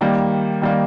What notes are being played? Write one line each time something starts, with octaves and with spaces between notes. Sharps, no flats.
D#3 G3 A#3
D#3 G3 A#3